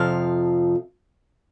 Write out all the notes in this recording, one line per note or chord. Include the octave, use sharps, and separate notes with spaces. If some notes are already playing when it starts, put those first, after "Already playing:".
Already playing: F2 C3 F3 F5